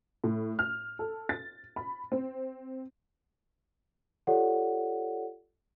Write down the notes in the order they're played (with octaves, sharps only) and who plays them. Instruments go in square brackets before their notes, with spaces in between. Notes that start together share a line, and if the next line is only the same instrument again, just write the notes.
[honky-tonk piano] A2
F6
A4
A6
B5
C4
[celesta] F4 G4 A4 C#5 D5 F#5